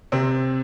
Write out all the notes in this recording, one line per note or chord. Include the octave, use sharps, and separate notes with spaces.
C3 C4